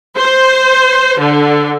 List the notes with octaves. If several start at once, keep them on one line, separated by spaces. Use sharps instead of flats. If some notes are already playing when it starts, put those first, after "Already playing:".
C5
D3